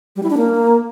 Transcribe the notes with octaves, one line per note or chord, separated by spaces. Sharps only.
G3
E4
D4
A#3